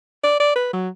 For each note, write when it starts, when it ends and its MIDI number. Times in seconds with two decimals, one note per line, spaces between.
0.24 0.39 74
0.40 0.55 74
0.56 0.70 71
0.73 0.89 54